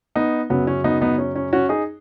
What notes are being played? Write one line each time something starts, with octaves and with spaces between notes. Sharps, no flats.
B3 D#4
F#2 C#3 F#3 B3
C#4
B3 D#4
B3 D#4
C#4
C#4
C#4 F#4
D#4 G#4